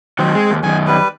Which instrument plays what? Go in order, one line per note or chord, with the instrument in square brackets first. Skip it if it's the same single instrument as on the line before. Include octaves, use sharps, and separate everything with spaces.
[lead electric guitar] D#3 F#3 [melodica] C4
[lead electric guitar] G#3
D#2
[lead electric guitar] F#2 D#3 [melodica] G#5
[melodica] G3 B4